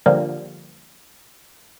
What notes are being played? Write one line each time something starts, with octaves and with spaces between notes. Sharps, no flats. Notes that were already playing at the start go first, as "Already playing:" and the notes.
D3 F3 G3 A#3